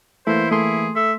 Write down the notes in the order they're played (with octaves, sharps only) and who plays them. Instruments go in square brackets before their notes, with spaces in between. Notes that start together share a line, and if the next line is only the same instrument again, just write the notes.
[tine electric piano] E3 A#3 [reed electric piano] A3 [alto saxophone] E4 [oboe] C5
[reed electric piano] A3 C6 [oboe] G#4
[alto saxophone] A4 [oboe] E5